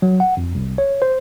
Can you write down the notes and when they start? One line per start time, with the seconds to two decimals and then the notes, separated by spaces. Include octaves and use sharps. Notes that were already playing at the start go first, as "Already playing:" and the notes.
0.02 F#3
0.20 F#5
0.37 F2
0.55 C2
0.78 C#5
1.02 C5